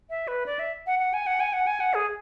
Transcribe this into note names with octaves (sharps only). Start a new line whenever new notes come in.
E5
B4
D5
E5
F#5
F#5
G#5
F#5
G#5
F#5
G#5
F#5
G#4